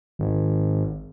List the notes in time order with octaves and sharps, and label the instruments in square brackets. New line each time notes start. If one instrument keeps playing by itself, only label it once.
[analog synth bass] G#1